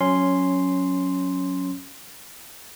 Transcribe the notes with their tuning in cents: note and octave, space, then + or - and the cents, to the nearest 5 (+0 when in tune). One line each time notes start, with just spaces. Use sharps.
F#3 -15 C#4 +0 C6 +0